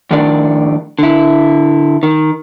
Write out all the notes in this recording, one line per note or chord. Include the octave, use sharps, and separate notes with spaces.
F2 A2 D#3 D4 D5
D3 E4
D#3